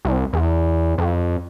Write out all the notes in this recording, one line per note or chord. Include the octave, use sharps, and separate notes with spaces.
C2
E2
F2